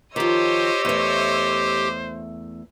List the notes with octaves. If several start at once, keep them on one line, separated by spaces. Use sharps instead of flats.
D#3 F3 G4 C5 C#5 D#5 E6
E2 A3 C5